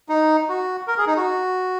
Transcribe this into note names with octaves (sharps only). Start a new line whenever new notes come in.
D#4
F#4
A#4
G#4
D#4
F#4